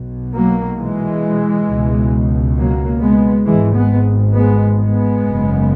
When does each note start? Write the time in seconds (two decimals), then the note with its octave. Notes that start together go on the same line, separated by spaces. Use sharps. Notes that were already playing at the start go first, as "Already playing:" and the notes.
Already playing: B1 B2
0.33 F#3 A#3
0.77 E3 G#3
1.67 C#2 B2
2.55 F#3 A#3
3.01 G#3 B3
3.45 G#1 G#2 E3 G#3
3.75 G#3 B3
4.34 G#3 B3
4.79 G#3 B3
5.23 F#1 F#2 C#3